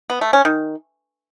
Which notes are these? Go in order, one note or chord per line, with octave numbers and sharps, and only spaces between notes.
B3
A3
C#4
D#3